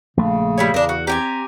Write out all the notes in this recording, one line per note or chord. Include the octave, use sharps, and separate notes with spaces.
A#1 C#3 A3
G3 E4 C#5
E2 D4 A#4
F#4
C4 G4 G5 G#5 A#5